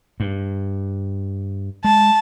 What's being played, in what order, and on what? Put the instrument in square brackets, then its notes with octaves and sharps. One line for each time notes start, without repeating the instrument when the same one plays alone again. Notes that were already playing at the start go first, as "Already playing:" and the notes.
[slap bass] G2
[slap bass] G#3 [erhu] A5